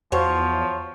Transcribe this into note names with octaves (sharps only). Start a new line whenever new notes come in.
E2 F3 F#4 C5 C#5 F5